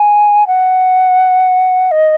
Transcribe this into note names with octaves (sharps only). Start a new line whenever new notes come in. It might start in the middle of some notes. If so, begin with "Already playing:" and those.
Already playing: G#5
F#5
D#5